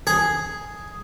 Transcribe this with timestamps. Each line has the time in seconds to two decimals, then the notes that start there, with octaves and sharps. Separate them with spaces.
0.07 G#4